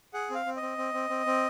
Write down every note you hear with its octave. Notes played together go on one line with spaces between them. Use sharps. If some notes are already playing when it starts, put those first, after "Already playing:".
G#4 F#5
C4 F5
C4
D#5
C4
C4
C4
C4
C4